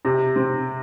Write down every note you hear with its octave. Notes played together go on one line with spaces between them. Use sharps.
C3
C4